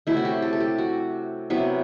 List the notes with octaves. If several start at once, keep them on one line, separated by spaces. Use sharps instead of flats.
C3 F#3 A3 E4
F#4
G4
A4
A4
G4
F#4
C3 F#3 B3 E4